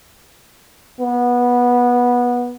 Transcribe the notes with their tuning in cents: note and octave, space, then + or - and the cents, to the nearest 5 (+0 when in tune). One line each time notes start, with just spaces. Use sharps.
B3 -15